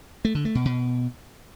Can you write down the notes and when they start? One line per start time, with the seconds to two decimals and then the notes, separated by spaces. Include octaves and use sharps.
0.25 A3
0.35 D3
0.45 A3
0.55 B2
0.65 B2